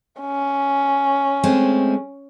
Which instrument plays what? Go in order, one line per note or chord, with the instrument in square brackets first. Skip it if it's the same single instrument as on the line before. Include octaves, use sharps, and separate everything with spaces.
[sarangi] C#4
[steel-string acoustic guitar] G#3 A3 C4